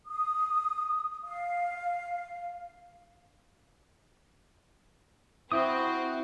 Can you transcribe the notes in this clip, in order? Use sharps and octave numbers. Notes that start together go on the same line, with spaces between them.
D#6
F5
C4 E4 F#4 G5 D#6